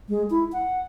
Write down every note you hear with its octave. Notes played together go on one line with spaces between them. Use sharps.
G#3
E4
F#5